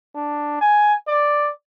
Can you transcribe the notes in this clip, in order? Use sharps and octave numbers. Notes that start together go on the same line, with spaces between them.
D4
G#5
D5